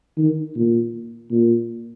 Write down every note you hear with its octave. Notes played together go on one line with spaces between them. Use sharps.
D#3
A#2
A#2